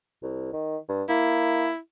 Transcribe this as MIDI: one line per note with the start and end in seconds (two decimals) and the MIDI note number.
0.23 0.51 36
0.53 0.77 51
0.89 1.03 43
1.09 1.68 58
1.09 1.78 64